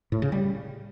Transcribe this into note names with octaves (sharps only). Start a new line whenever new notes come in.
A2
C#3
G3